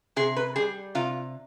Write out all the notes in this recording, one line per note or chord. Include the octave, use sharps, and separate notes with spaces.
C3 G#4
B4
G3 G#4
C3 F4